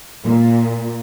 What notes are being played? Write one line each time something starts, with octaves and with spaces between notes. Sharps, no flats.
A#2